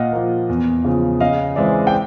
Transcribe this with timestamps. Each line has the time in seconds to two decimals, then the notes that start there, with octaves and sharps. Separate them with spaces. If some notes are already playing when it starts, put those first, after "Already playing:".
Already playing: A#2 D#5 F5 F#5
0.13 F3 A#3
0.49 E2
0.85 C#3 F3
1.20 C#3 D#5 F5
1.56 E3 G#3 C4 D5 E5
1.87 G5